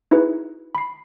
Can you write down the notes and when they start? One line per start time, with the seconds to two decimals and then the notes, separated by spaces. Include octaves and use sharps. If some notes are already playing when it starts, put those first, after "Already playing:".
0.11 D#4 E4 F#4 G#4 B4
0.75 B5 C7